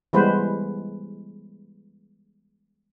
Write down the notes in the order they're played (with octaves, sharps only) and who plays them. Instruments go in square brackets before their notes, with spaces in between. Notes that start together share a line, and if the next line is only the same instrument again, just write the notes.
[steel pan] E3 G3 G#3 B3 B4 C5